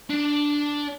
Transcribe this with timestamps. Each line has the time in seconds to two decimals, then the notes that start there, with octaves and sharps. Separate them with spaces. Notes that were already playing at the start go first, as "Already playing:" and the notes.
0.10 D4